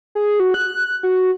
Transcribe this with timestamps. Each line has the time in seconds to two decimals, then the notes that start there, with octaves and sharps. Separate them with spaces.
0.15 G#4
0.40 F#4
0.54 F#6
1.03 F#4